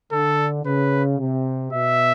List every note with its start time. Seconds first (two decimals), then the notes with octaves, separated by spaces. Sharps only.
0.12 D3 A4
0.65 C#3 B4
1.19 C3
1.72 B2 E5